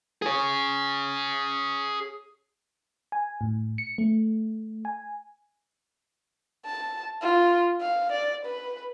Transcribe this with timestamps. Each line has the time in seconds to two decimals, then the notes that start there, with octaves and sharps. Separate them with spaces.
0.22 G#4 C#5
3.12 G#5
3.41 A2
3.78 C#7
3.98 A3
4.85 G#5
6.66 A5
7.22 F4
7.81 F5
8.12 D5
8.45 B4